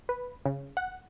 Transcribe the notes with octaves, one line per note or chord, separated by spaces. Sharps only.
B4
C#3
F#5